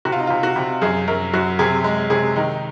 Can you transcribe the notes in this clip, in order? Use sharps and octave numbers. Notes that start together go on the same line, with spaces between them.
C3 F#4
F4
D#4
C3 F4
F#4
C3
F#2 G#4
F#2 A#4
F#2 F#4
C3 G#4
G#3
C3 G#4
D#3 D#4